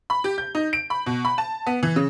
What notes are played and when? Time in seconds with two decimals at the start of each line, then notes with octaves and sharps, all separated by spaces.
0.10 B5
0.24 G4
0.38 G6
0.55 D#4
0.73 D7
0.90 B5
1.06 B2
1.25 B5
1.38 A5
1.67 B3
1.83 E3
1.96 C#3